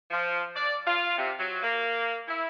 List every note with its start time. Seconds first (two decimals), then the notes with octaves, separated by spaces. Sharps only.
0.11 F3
0.53 D5
0.85 F4
1.17 C3
1.37 F#3
1.61 A#3
2.27 E4